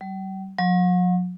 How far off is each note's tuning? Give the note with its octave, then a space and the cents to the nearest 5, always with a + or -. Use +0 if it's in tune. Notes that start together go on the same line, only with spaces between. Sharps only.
G3 -40
F#3 -45